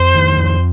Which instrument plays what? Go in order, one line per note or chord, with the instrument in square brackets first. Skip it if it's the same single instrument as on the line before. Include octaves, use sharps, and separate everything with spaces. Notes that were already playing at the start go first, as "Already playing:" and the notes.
Already playing: [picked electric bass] F2 [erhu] C5
[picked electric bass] D#3
F2